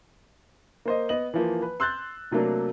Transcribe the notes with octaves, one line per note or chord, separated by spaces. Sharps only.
A#3 C5 D#5
B3 D#5 F#7
E3 F3 A#3
B4
C6 E6 F#6 G6 A6
C3 F#3 A3 A#3 D4